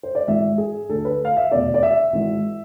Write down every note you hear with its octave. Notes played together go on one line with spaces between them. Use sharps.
C5
D5
G#1 G#2 E3 E5
G#4
D2 D3 A4
B4
F5
E5
F1 E2 B2 D5
D5
E5
G#1 G#2 E3